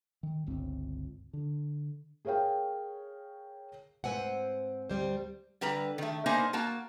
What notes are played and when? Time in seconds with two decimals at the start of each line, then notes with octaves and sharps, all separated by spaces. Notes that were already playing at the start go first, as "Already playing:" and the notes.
0.23 D#3
0.47 G1 C#2 C4
1.33 D3
2.25 G#4 A#4 C#5 F5 G5
4.04 G#2 C4 B4 F#5 G#5
4.90 D2 G3 C5
5.61 D3 G3 B4 A#5
5.98 D#3 A3
6.26 A#3 B3 D4 D#4 C5 G#5
6.53 A#3 F#4 A5